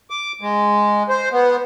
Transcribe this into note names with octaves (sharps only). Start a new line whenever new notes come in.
D6
G#3
C5
B3